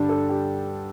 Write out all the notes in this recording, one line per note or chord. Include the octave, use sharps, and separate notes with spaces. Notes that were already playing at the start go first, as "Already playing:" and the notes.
Already playing: G2 D3 G3 D4
A4
G4